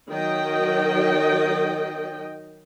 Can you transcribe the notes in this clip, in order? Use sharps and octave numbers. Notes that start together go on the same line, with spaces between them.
D#3 F#3 D#5 G5